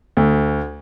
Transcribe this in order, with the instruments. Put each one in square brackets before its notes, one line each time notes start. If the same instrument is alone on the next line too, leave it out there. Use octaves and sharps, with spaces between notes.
[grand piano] D2